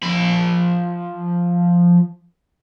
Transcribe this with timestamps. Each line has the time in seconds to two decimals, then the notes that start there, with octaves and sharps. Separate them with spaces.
0.03 F3 B5